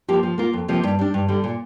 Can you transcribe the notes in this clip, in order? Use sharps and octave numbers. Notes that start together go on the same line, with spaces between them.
F3 A#3 G4
F3
A#3 F4 A#4
F2
C3 F3 A#3
G2
G3 D4
G2
D3 G3
A#2